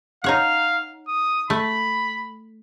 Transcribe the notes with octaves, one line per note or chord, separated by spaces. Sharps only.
D#4 C#5 F5 F#5
D#6
A3 B5